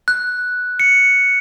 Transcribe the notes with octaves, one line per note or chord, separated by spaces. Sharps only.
F#6
C#7